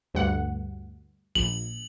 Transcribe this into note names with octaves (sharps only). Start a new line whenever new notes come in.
D2 G2 F#5
A#1 F#7